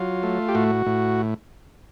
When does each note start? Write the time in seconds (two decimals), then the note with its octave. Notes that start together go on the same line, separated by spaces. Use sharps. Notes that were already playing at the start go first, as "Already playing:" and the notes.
Already playing: F#3 F4
0.23 A3
0.48 G4
0.55 A2 F#4
0.86 A2